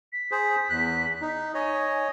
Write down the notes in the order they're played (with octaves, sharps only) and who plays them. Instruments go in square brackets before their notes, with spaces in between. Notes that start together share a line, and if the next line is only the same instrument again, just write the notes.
[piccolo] B6
[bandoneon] G#4 C5
E2 F#6
D#4
[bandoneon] C#5 D#5 [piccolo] G#5